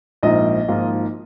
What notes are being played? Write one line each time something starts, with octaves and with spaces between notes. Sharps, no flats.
A#1 G#2 F3 A#3 D#4 D#5
G#1 G#2 F3 A#3 F4